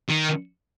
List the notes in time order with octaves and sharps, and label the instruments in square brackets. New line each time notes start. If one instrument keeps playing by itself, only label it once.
[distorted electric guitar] D#3